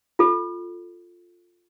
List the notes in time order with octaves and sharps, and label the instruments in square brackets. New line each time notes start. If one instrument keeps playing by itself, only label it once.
[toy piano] F4 A4